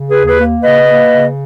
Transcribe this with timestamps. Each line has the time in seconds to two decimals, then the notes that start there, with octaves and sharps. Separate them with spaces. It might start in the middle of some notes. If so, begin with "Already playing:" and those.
Already playing: C#3
0.10 G#4 B4
0.16 D#2
0.27 G#4 B4
0.39 A#3
0.62 C#3 B4 D#5
0.85 A#3
1.09 C#3